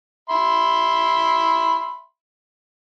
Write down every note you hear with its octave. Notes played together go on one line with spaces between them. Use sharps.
E5 B5 C6